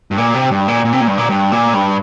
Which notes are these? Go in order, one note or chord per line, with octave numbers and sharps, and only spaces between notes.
G2
A#2
C3
G2
A#2
A#2
C3
A#2
G2
A#2
G2
A#2
G2